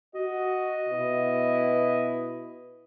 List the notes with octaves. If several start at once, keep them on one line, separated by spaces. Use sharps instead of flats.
F#4 D#5
B2 E4 B4